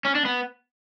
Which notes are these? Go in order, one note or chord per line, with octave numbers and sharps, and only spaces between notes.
C#4
D4
B3